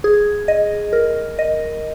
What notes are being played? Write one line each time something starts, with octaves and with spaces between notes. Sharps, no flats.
G#4
D#5
A#4
D#5